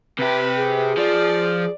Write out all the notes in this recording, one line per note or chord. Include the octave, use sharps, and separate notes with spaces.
C3 G4 B4
G#4
F3 D5